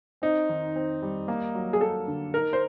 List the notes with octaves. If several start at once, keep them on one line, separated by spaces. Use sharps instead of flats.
C4 D#4
D#3
C4
G3
A#3
F#3
G#4
A#3 A4
D3
D#4 A#4
C5